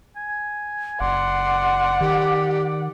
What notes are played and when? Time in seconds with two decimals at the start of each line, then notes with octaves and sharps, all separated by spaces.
0.16 G#5
1.01 F#1 D5 F#5 C6
2.01 D#3 G4